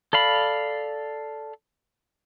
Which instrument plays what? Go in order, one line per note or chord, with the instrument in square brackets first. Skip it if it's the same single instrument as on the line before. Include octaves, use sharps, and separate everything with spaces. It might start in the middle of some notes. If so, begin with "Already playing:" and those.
[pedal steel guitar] A4 D5 F5 B5